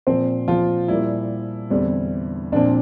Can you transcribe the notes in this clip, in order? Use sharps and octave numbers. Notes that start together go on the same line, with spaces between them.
A#2 F3 A#3 C4 C5
F3 F4
A#2 G3 A#3 E4
E2 D3 G3 C4
A#2 F3 C4 D4